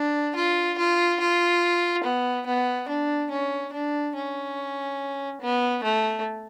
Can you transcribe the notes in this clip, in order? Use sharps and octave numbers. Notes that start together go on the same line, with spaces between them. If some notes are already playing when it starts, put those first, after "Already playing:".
Already playing: D4
F4
F4
F4
B3
B3
D4
C#4
D4
C#4
B3
A3